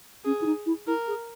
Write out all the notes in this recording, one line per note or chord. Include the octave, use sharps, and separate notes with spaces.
C#4 G#4
E4
D#4
E4
E4 A#4
G#4